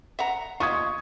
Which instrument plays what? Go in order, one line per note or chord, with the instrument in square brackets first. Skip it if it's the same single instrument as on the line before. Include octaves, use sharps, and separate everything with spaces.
[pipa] E5 F#5 A#5
[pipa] F4 D#5 E5 [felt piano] C#6 D#6 G#6